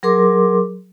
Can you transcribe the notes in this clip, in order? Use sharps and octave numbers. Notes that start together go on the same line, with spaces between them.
F#3 G#4 A#4 C6 D6